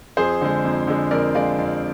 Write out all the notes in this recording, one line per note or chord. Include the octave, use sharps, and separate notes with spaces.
F2 G#4 C5
D3 G#3
F2
D3 G#3
F2 A#4 D5
D3 G#3 D5 F5
F2